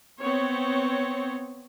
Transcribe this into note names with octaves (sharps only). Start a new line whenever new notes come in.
B3 C4 C#5